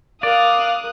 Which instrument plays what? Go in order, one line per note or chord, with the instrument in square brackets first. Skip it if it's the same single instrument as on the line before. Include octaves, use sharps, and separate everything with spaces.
[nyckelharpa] A#4 [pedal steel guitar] D5 [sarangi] F5 [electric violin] D#6 F#6